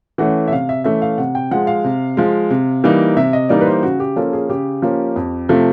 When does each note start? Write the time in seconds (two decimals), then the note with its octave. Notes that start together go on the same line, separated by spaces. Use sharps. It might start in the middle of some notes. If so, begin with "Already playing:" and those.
0.18 E3 A3 C#4 F#5
0.47 E5
0.51 C3 F5
0.69 E5
0.84 E3 A3 C#4 E5
1.02 F5
1.18 C3 F#5
1.35 G5
1.51 F3 G#3 F#5
1.67 F5
1.84 C3
2.17 F3 G#3
2.50 C3
2.84 E3 G3 A#3 D#4
3.17 C3 E5
3.33 D#5
3.49 E3 G3 A#3 D#4 D5
3.61 B4
3.66 C5
3.83 C#3 F#4
4.00 G4
4.16 F3 A#3 C#4 A4
4.33 G#4
4.49 C#3 G4
4.82 F3 A#3 C#4
5.16 F2
5.49 C3 F3 A3